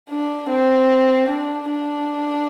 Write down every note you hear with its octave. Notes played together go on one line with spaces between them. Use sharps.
D4
C4
D4
D4